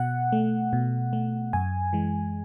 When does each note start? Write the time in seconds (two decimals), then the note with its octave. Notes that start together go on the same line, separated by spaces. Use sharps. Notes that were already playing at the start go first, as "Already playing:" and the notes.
Already playing: B2 F#5
0.32 A3
0.73 B2
1.13 A3
1.53 F#2 G#5
1.93 E3 G#3